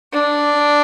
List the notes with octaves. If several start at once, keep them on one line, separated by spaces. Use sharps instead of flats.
D4